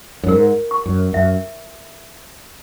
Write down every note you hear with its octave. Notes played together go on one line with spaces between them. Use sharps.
F#2
G#2 A#4
C#6
F#2
F#2 E5